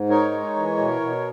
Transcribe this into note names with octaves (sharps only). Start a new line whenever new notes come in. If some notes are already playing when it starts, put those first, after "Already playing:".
Already playing: G#2
D#4 A#4 C#5
G#3
E3
B2
B2